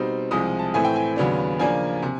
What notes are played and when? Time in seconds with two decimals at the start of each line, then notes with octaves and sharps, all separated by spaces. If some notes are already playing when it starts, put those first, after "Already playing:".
Already playing: B2 G3 C4 D#4
0.31 C2 C3 F3 G#3 D#6
0.59 A5
0.74 A2 E3 A3 C4 G#5
0.85 G5
0.96 G#5
1.16 D#2 C#3 F#3 B3 D4
1.59 C#3 F3 A#3 D4 G#5
2.03 C3